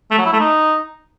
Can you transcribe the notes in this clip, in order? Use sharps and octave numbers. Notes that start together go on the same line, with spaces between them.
A3
F#3
E4
A3
D#4